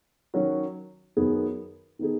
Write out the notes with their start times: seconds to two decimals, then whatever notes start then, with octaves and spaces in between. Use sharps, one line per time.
0.34 D#3 F#3 C#4 F#4
1.17 F#2 D#3 B3 D#4 G#4
1.99 D#3 B3 D#4 G#4